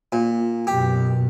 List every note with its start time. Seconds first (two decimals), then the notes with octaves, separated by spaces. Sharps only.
0.12 A#2
0.67 F#2 B2 G4